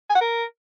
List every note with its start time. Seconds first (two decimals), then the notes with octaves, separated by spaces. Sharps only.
0.10 G#5
0.15 F#5
0.21 A#4